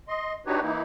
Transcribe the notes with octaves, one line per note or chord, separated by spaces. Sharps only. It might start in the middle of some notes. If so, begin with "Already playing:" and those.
D#5 C6
D4 D#4 F#4 G4 B4 C#5
E3 A#3 D#4 E4